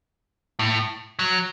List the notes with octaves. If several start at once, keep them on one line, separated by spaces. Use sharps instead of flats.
A2
F#3